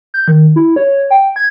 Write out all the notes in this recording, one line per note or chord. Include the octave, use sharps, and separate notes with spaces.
G6
D#3
E4
C#5
G5
G#6